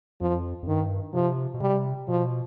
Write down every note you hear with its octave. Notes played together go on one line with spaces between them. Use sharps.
F2 F3
F2
G2 D#3
C3 F3
B2
C3 G3
B2 F3